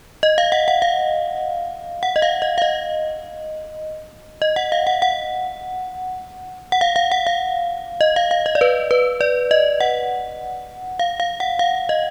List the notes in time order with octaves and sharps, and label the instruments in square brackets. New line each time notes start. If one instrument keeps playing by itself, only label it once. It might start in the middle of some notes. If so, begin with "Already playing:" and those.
[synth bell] D#5
F5
F#5
F#5
F5
F#5
D#5
F5
D#5
F5
D#5
D#5
F#5
F5
F#5
F#5
F#5
F5
F5
F#5
F5
D#5
F5
F5
D#5
D5
B4
B4
D5
D#5
F#5
F5
F5
F#5
F5
D#5